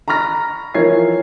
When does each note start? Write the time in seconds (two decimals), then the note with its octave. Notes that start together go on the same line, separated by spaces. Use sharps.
0.08 A#5 B5 C#6 F6 A#6
0.74 E3 F3 A#4 C#5 G#6 C7